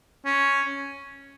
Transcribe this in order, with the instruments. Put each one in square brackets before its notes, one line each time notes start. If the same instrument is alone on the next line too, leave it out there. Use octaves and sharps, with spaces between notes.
[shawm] C#4